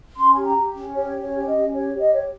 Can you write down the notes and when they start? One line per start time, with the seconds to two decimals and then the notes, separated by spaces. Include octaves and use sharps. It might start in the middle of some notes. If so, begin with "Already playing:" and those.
0.16 C#4 C6
0.35 G4 G#5
0.43 A#5
0.56 G4
0.75 C#4
0.95 G4 C#5
1.15 C#4
1.21 C#5
1.34 G4
1.47 D#5
1.54 C#4
1.74 G4 C#5
1.93 G4
1.99 D#5
2.13 C#5